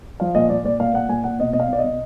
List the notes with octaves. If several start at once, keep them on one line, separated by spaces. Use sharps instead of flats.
F3 F5
A#2 D#5
A#2 D5
A#2 D5
A#2 F5
A#2 F#5
A#2 G#5
A#2 F#5
B2 D#5
B2 D#5
F5
B2 D5
D#5
B2